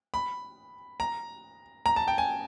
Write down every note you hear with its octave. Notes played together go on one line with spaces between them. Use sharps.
B5
A#5
A#5
A5
G5
G#5